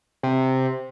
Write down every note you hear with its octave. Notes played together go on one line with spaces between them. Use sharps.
C3